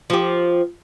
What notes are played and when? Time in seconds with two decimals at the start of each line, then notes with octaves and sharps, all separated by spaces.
0.10 F3 G4